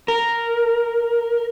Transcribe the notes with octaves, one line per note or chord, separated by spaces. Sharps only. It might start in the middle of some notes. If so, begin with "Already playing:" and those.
A#4